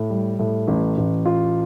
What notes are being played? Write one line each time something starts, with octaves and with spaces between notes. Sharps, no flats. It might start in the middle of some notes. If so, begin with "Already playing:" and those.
Already playing: A2
G3
A2
A1
A1
F4